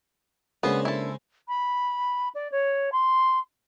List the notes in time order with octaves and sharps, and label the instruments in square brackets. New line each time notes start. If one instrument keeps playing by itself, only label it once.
[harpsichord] C#3 G#3 C5 [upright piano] A#3 C#4 D4 [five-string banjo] B3
[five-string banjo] E4 A4
[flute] B5
D5
C#5
C6